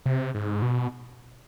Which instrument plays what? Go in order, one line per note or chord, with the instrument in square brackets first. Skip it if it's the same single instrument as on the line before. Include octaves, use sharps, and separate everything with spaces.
[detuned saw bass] C3
G#2
B2